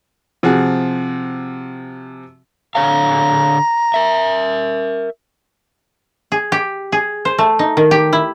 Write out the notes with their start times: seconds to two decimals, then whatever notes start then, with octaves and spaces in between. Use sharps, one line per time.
0.43 C3 F3 F#4 G#4
2.75 D3 C#5 F5 A#5
3.94 A#4 E5
6.32 G#4
6.52 G4
6.92 G#4
7.25 C5
7.39 A3
7.59 D#4
7.77 D#3
7.91 G4
8.13 E4